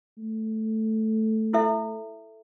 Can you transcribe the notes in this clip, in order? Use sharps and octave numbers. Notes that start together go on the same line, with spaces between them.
A3
E4 A4 E5